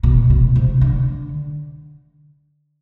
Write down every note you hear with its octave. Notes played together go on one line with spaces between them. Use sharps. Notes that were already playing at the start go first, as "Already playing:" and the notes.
B2
B2
C3
D3